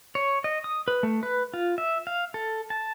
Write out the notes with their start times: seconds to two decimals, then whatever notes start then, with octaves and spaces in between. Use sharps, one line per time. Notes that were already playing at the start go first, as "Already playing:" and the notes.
0.15 C#5
0.44 D#5
0.64 D#6
0.88 B4
1.03 A3
1.23 B4
1.54 F4
1.78 E5
2.07 F5
2.34 A4
2.70 A5